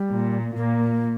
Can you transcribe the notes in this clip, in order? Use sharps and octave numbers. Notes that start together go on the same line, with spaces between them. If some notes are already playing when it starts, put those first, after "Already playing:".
Already playing: G3
A#2
A#2 A#3